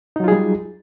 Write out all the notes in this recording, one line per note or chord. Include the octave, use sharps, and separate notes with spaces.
F#3 G3 D#4 F4 G#4